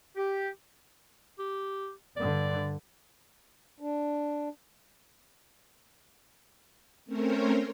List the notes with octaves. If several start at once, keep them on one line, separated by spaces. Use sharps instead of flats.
G4
G4
G2 D3 D5
D4
A3 C4 C#4 A#4 C5 C#5